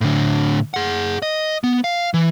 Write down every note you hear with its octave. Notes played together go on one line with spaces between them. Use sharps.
A2 D3
G#4 F#5
D#5
B3
F5
E3